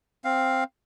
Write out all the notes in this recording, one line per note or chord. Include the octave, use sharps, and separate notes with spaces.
C4 F5